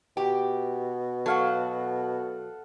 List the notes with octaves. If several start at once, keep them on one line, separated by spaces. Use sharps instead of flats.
B2 G4
F#3 A4 F5 F#5